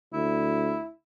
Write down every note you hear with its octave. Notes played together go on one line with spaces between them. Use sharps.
D2 E4